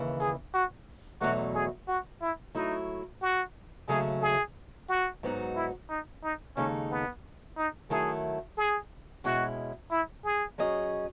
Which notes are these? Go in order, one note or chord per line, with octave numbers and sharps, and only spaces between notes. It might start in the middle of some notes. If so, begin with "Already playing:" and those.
Already playing: D#2 C#3 E3
G#4
F#4
E2 B2 F#3 A3 D#4 F#4
G#4
F#4
E4
F#3 A3 D#4 E4
F#4
D#2 C#3 F#3 A3 C#4 G#4
G#4
F#4
G#2 F#3 B3 D#4 F#4
E4
D#4
D#4
D#2 C#3 G#3 C#4 D#4 A4
B3
D#4
D#3 F#3 A3 E4 G#4 A4
G#4
B2 G#3 C#4 E4 F#4
E4
G#4
F#3 C#4 G#4 D#5